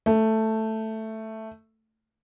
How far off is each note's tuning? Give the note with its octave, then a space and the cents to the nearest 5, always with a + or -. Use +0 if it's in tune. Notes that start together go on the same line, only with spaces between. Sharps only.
A3 +5